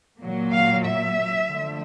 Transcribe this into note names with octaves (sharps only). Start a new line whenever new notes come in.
A#2 F#3 A#3
F5
E5
D3 F3 A3